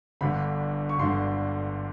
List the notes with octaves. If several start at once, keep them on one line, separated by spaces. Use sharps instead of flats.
G1 G2 D3 B5
C#6
G1 G2 D3 C6